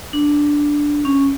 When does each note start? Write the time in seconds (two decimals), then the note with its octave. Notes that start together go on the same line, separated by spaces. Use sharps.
0.13 D4
1.05 C#4